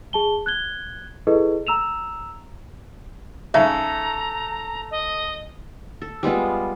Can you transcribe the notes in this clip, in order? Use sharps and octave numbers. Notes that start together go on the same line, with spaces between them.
G#4 A5 G7
F#6 G#6 G7
E4 G#4 A4 B4 D#5
A#5 E6 E7 F7
G#2 C#3 A4 E5 A#5
D#5
A4
G3 G#3 B3 F4